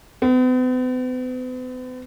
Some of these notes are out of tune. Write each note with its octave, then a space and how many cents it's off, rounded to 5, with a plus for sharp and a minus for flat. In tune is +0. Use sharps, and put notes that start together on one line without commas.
B3 +45